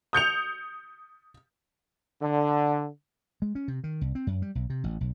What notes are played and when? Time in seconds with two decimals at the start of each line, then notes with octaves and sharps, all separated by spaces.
0.13 D#6 G6 C#7 F7
2.21 D3
3.42 G#3
3.55 C#4
3.68 C3
3.84 D#3
4.01 C2
4.15 C4
4.27 F#2
4.42 G3
4.55 B1
4.70 C3
4.84 A1
5.01 B1